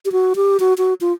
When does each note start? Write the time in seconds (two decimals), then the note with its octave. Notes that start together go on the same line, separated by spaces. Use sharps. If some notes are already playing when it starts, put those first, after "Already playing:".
0.05 G4
0.12 F#4
0.36 G4
0.60 F#4
0.78 F#4
1.01 F4